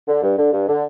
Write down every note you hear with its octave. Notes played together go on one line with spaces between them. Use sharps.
D3
G2
D3
G2
D3